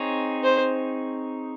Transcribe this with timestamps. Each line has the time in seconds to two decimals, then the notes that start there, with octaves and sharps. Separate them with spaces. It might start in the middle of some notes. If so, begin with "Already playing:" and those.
Already playing: C4 D#4 G#4 C#5
0.44 C5